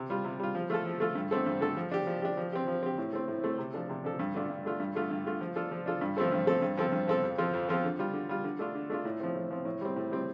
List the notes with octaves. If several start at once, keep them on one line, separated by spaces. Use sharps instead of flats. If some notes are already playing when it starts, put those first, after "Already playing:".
Already playing: C3
G3 F4
C3
G3 F4
F3
A3 F4 A4
F3
A3 F4 A4
G2
D3 A3 C4 A4
G2
D3 A3 C4 A4
F3
D4 G4
F3
D4 G4
F3
C4 G4
F3
C4 G4
A2
A3 C4
A2
A3 C4
C3
F3 D4 A4
C3
F3 D4 A4
G2
D3 A3 D4 F4
G2
D3 A3 D4 F4
G2
D3 A3 F4
G2
D3 A3 F4
F3
D4 F4 A4
F3
D4 F4 A4
G2
F3 A3 C4 A4
G2
F3 A3 C4 A4
G2
F3 C4 A4
G2
F3 C4 A4
F2
F3 C4 F4 A4
F2
F3 C4 F4 A4
D3
G3 F4
D3
G3 F4
D3
A3 D4 F4
D3
A3 D4 F4
A2
F3 C4
A2
F3 C4
A2
G3 C4
A2
G3 C4